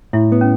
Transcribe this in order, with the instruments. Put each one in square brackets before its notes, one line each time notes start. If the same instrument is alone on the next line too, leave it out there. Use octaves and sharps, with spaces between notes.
[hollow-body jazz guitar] A2 [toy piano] E4
[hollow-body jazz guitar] B3
[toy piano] C#4